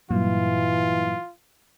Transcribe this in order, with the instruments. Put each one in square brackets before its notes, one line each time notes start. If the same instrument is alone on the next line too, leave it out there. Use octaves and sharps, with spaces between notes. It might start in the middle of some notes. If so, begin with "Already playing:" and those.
[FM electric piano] G2 A#2 F#3 [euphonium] E3 [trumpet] F4